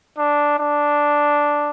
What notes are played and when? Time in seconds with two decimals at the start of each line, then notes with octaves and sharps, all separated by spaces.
0.18 D4
0.59 D4